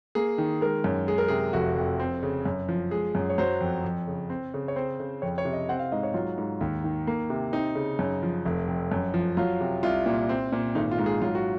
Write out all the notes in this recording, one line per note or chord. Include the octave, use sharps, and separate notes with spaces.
A#3 G#4
D#3
G#3 A#4
F#2
G#3 G#4
A#4
C3 G#4
F1 F#4
F2
C4
C#3
F#2
F3
G#3 G#4
F#2
C#5
F#3 C5
F2
F2
C#3
C4
C#3
C#5
C4 C5
C#3
F2 C#5
C#5
C3
D#5
C4 F#5
F5
G#2 D#5
C#5
F#3 F4
G#2
D#2
D#3
A#3
C3
C4 D#4
C#3
F#2
F3
F1
F2
F#2
F3
F#3 F4
C3
C2 F4
A#2
C4
A#2
G#1 D#4
F4
G#2
G#4
F#3 F4
F#4